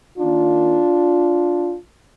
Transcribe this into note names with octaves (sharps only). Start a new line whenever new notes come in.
D#3 A#3 D4 F4